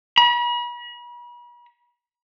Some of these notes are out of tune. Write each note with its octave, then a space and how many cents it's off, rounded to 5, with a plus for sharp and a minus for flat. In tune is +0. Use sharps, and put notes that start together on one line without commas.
B5 -40